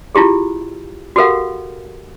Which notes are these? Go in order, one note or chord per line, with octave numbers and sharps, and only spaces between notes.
E4 F4 G4 G#4
F#4 G4 A4 A#4 F5 F#5